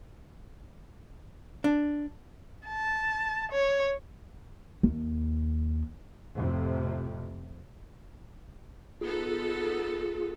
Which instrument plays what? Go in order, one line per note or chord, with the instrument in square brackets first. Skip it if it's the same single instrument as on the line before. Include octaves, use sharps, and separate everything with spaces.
[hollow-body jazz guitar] D4
[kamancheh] A5
C#5
[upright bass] D#2
[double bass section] F2 A2 C3
[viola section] B3 D#4 A4 [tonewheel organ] F4 G#4